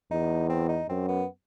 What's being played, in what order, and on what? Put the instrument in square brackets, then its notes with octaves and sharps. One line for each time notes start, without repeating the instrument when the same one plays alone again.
[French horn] E2 [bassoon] D#4
[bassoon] C4
D#4
[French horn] F#2 [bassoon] C4
[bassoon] B3